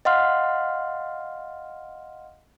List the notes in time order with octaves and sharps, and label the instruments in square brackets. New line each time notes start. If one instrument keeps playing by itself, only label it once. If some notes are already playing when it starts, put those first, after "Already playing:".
[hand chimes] D#5 F5 F#5 C6 F6